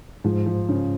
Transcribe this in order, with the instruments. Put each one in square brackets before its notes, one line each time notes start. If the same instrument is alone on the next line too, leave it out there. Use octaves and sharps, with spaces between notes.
[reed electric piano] G#2 [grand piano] F3
[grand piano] F3
C#3